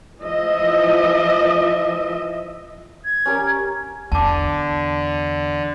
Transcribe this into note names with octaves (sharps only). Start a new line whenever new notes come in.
E3 F3 D#5 E5
G#6
C#4 G4 A#4
E2 D3 A5 D6